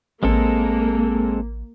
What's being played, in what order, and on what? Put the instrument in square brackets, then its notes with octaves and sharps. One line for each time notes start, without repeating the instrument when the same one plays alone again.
[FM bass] A1 [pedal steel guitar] G#3 C4 A4 [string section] A#3